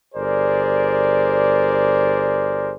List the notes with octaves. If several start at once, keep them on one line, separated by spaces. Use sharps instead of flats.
G1 G#4 A#4 C5 D5